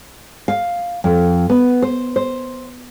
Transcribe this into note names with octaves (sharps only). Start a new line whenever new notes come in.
F5
F2
B3
C5
C5